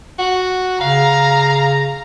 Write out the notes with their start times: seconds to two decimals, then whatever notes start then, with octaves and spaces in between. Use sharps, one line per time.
0.19 F#4
0.81 C#3 F5 A#5